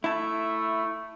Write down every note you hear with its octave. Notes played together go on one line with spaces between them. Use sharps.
A3 E4 A5